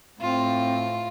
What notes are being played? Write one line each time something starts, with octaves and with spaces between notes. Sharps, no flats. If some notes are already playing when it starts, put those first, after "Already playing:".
A2 C4 F4